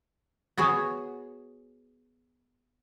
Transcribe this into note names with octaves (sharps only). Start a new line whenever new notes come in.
B3 F#4 G#4 C#5